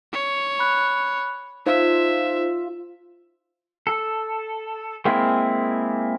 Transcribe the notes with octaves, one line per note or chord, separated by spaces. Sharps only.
C#5
B5 F#6
D#4 F4 C5 E5
A4
G#3 A#3 C4 E4